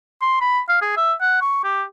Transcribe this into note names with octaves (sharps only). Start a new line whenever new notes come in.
C6
B5
F5
G#4
E5
F#5
C#6
G4